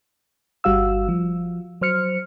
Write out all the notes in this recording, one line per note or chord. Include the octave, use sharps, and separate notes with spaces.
G1 G3 F#4 F5 E6
F3
F#3 C5 F6 C#7